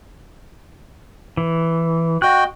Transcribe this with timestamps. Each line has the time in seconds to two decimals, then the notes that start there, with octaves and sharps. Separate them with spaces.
1.37 E3
2.22 F#4 D#5 G5 F#6